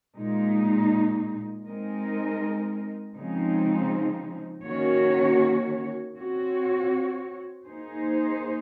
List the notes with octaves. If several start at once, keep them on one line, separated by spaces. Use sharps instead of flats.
A#2 G#3 D#4
G#3 C4 D#4 A#4 D#5
C#3 F3 G#3 C4 D#4
D#3 A#3 C#4 F#4 C#5
C4 F#4 C#5
A#3 D#4 G#4 C5